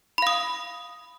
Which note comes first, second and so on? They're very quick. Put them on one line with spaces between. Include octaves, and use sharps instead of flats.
B5 F5 D#6